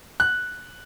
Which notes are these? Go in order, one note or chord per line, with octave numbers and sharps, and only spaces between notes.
F#6